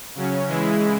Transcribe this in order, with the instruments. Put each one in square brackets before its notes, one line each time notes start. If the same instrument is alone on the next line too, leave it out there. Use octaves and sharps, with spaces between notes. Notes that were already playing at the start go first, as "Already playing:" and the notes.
[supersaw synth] C#3 F#3 C#4
C#3 E3 G#3 E4